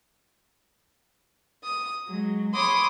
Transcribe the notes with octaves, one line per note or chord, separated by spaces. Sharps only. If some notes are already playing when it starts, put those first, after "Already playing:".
D#6
F#3 G#3
C#5 B5 C6 D6 D#6